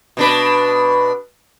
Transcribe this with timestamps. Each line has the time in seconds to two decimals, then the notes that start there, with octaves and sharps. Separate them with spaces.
0.17 B2 D4 B4